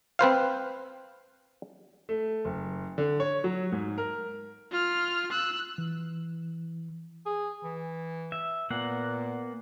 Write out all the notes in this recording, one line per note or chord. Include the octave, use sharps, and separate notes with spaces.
C4 B4 C5 F5
A3
F#1
D3
C#5
F#3
G#2
A#4
F4 F6
E6 F#6
E3
G#4
E3
E5
A#2 A#3 B3 F#5